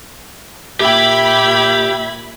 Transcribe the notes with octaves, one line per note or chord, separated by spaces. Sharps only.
A#2 G4 E5 G5 B5 G#6